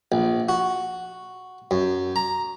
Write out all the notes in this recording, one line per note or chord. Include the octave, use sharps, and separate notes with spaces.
A#1
F#4
F#2
A#5